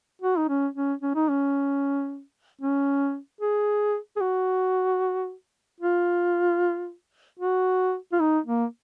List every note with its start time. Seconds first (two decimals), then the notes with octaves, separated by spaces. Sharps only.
0.21 F#4
0.38 D#4
0.49 C#4
0.75 C#4
1.01 C#4
1.15 D#4
1.28 C#4
2.61 C#4
3.41 G#4
4.16 G#4
4.21 F#4
5.80 F4
7.39 F#4
8.12 F4
8.20 D#4
8.46 A#3